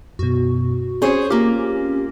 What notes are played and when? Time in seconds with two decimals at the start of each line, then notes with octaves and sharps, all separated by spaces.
0.19 F#2 B2 F#4
1.02 C4 C#4 G#4 C5 C#5
1.30 A#3 F4 G4